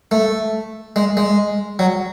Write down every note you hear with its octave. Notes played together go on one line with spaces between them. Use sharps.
A3
G#3
G#3
F#3